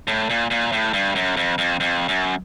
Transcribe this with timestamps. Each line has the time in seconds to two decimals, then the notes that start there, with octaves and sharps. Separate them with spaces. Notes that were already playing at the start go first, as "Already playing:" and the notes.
0.07 A2
0.30 A#2
0.50 A#2
0.72 A2
0.93 G2
1.15 F#2
1.37 F2
1.58 F2
1.80 F2
2.08 F#2